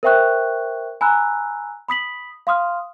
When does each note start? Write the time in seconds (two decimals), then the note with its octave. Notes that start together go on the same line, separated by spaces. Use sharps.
0.03 A#4 C5 E5 G5 C#6 F#6
1.01 G#5 A#5 B5 E6 F#6
1.89 B5 D#6 B6 F#7
2.47 F5 C6 D#6 F6